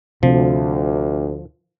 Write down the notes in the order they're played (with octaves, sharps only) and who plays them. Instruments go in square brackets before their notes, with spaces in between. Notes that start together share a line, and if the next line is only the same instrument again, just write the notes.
[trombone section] D2 [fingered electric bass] C3 [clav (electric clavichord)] F3